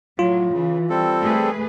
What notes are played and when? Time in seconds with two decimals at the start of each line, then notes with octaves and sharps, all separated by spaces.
0.19 A2 F#3 F4
0.53 C#3 E3
0.90 G3 C4 A4
1.22 A3 G#4 B4